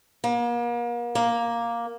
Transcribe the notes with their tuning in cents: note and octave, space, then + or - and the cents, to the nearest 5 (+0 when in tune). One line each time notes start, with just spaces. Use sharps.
A#3 +40
A#3 +5